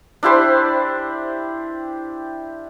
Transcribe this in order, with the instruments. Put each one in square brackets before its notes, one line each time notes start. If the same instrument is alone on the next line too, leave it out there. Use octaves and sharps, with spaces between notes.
[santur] D4 E4 G4 C5